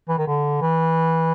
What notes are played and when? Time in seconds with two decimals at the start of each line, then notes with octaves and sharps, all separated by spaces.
0.09 E3
0.18 D#3
0.27 D3
0.61 E3